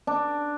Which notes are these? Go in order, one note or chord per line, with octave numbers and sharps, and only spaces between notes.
D4